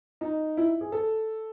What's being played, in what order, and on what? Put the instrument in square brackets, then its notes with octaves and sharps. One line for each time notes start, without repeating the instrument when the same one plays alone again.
[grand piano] D#4
E4
G#4
A4